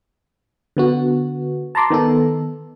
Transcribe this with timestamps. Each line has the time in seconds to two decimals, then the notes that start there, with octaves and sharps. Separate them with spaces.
0.77 D3 B3 F#4
1.75 A5 A#5 C6 D6
1.90 D#3 B3 D#4 A4